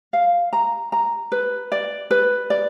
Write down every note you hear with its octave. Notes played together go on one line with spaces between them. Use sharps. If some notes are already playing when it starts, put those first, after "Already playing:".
F5
A#5
A#5
B4
D5
B4
D5